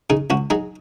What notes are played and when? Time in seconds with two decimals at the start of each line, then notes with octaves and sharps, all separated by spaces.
0.10 C#3 D#4 G#4
0.30 C#2 C#4 F#4
0.50 F#3 D#4 G#4